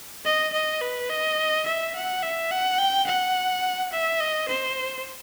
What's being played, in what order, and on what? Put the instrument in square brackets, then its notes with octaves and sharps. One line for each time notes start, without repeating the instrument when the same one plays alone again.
[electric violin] D#5
D#5
B4
D#5
E5
F#5
E5
F#5
G5
F#5
E5
D#5
C5